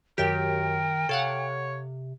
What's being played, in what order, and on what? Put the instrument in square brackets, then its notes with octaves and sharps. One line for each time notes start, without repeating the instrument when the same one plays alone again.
[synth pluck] F#2 G4 [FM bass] D#3 [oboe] A#4 [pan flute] G5
[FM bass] C3 [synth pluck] A4 F5 F#5 [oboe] C#5